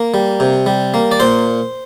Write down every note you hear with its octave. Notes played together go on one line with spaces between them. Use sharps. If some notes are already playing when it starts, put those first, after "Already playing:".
Already playing: A#3
G3
C3
G3
A#3
D5
A#2 C5